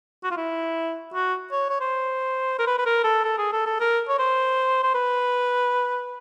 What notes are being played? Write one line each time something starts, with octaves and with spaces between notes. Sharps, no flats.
F#4
F4
E4
F#4
C#5
C#5
C5
A#4
B4
B4
A#4
A4
A4
G#4
A4
A4
A#4
C#5
C5
C5
B4